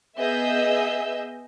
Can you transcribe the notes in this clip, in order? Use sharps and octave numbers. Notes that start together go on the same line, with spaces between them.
B3 G#4 D#5 E5 E6 G6